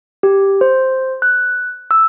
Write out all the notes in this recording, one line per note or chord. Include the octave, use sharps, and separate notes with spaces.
G4
C5
F#6
E6